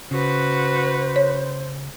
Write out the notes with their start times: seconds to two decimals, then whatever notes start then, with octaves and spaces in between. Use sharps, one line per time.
0.11 C#3 F#4 B4 C5
1.16 C#5